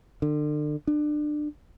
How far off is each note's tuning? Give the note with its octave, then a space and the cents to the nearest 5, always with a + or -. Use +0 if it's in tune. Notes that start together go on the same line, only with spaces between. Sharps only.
D3 +35
D4 +25